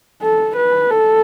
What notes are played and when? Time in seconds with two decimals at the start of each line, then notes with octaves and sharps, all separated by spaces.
0.22 A4
0.57 B4
0.91 A4